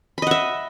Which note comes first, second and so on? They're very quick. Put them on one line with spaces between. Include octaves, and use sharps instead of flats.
B5 D#5 F#5 E5